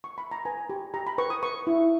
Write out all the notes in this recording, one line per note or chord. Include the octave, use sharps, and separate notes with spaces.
C#6
B5
A#5
B4 G#5
G4
G4 A#5
B5
B4 C#6
D#6
B4 C#6
E4